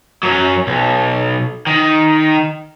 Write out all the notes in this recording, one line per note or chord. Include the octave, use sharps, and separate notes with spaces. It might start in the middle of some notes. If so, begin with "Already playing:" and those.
F#2 F#3
B1
D#3